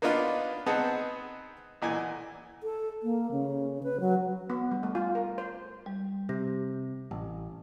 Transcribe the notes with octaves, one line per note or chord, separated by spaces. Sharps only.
A#3 B3 D4 D#4 F4 B4
B3 C4 D#4 G#4 F#5 A5
B1 A#2 E3 G#5
A4
A#3
C#3
B4
F#3
B3
G3
A3
F4
A#4
C5
G3
C3 G4 A#6
A1